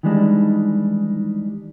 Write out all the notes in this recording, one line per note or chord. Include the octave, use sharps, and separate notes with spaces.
D#3 E3 G3 G#3 D4 D#4